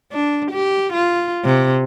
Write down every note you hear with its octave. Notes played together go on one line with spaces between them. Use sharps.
D4
G4
F4
C3